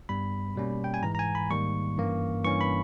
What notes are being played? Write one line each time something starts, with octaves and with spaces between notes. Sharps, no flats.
G2 G3 B3 B5
B2 G3 A#3 C#4
G5
G#5
G#2 E3 G#3 A#5
A#5
G#5
B5
G#2 D#3 G3 A#3 C#6
G2 E3 A#3 C#4
G2 E3 A#3 C#4 C#6
B5